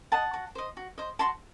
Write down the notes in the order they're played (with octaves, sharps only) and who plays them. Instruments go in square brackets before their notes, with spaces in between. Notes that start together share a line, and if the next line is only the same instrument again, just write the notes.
[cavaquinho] D#5 F#5 A5
F#4
C5 D#5
F#4
C5 D#5
F#4 A5 C6